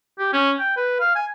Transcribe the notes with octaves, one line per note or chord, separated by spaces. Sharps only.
G4
C#4
G5
B4
F5
G#5